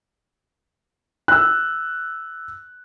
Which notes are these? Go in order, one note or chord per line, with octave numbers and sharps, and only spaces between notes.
E6 F#6